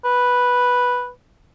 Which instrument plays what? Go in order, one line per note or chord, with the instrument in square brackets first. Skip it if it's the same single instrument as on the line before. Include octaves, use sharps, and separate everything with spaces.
[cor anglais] B4